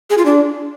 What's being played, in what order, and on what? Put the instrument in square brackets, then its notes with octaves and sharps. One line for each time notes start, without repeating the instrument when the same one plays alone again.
[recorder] G#4
F4
D4